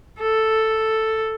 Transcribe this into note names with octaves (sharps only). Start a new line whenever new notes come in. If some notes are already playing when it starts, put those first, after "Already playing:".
A4